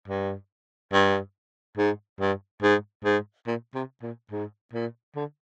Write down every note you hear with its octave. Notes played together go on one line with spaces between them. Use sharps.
G2
G2
G#2
G2
G#2
G#2
A#2
C3
A#2
G#2
A#2
D3